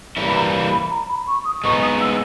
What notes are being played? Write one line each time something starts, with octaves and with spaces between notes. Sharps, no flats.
E3 G3 A#3 E4
B5
A#5
B5
B5
A#5
B5
C#6
D#6
G#3 B3 D#4 C#6
D#6
E6